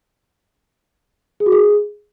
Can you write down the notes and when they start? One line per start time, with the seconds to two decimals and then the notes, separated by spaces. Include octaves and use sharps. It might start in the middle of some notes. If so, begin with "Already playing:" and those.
1.40 G#4
1.46 F#4
1.52 G#4